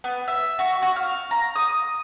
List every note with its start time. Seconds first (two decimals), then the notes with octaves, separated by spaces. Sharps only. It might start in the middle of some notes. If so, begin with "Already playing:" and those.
0.04 B3
0.28 E5
0.59 F#4
0.82 F#4
0.96 F5
1.31 A#5
1.56 D#6